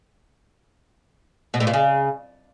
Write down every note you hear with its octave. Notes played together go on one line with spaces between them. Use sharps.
B2
A2
A#2
C#3